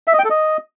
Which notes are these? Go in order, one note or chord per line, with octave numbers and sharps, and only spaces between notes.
E5
D#5
G5
A4
D#5